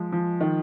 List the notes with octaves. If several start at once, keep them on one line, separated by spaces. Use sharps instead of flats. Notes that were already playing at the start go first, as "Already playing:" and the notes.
Already playing: F3 G#3
F3
D#3